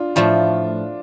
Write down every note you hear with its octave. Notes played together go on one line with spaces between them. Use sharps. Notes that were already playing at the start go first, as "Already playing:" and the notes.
Already playing: D4 F4
A2 F3 A3 D4 F4